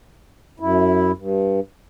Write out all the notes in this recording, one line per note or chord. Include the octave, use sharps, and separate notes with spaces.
F#2 E4
G2